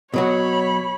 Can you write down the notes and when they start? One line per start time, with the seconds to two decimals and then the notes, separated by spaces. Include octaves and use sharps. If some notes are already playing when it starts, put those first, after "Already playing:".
0.14 B2 F#3 F#4 C#5 B5